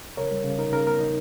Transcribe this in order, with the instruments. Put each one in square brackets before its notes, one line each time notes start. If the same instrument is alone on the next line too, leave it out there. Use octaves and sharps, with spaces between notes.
[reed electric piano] C#3 A#4 C#5
G3
C#3
D#4 A#4
C#3 A#4
B3 A#4
D#4